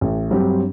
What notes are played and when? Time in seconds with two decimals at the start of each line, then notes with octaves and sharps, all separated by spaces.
0.01 A1
0.31 G2 F#3 C4 G4